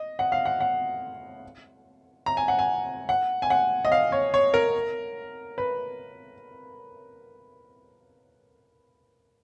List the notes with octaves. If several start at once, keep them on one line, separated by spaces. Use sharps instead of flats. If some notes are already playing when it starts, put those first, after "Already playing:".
Already playing: D#5
F#5
F5
F#5
F#5
A#5
G#5
F#5
G#5
F#5
G#5
F#5
D#5
F5
C#5
C#5
A#4
B4